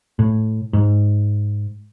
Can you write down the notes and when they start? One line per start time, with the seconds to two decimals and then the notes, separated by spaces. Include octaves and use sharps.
0.19 A2
0.73 G#2